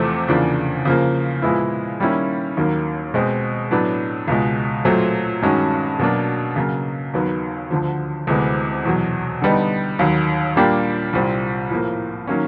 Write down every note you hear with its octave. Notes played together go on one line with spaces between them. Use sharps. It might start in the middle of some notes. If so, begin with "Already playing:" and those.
Already playing: E2 C3 F3 A3
E2 C#3 F3 A#3 D4
C#3 F3 A#3
A#2 F3 G#3 B3 E4
D#3 G3 A#3 C#4 E4
D#2 D#3 F#3 A#3
B2 G#3 C4
A2 F#3 B3 D4
C#2 B2 G#3
A#2 F#3 A3 C4
G2 D#3 G#3 C#4 F#4
B2 F#3 A#3 D4
C#3 F#3 A#3
D#2 D#3 F#3 B3
D2 D3 F3
D2 C3 E3 G#3 B3
E2 B2 F#3
D3 G3 B3 D#4
D#2 D#3 F#3
A#2 G3 A#3 D4 G4
C2 A#2 G3 C4
A2 F3 A#3
D#3 F#3 A#3 C#4